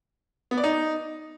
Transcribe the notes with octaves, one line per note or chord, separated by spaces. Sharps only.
B3
D5
D#4